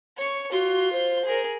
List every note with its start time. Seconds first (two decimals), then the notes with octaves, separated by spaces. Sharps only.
0.17 C#5 C#6
0.52 F4 F#4 C6
0.93 C5
1.25 G#4 A#4